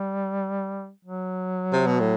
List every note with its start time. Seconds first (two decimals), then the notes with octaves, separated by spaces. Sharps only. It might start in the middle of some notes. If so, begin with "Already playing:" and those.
Already playing: G3
1.05 F#3
1.73 C3
1.86 B2
2.00 A2